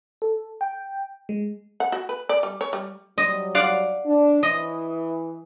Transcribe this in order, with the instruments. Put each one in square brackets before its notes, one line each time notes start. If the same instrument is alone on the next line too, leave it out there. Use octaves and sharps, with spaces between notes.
[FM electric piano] A4
G5
G#3
[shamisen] F#5
F#4
B4
D5
G3
C#5
G3
[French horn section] F#3 G3 [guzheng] D#5
[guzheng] D5 F5 F#5
[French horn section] D4
[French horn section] E3 [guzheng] D#5